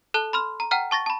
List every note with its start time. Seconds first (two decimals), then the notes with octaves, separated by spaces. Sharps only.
0.14 A4 A5 F#6 G7
0.33 B5 C6 F6
0.60 A#5
0.71 F#5 G5 A#5 F6
0.91 A5 C#6 A6 A#6
1.06 A5 B5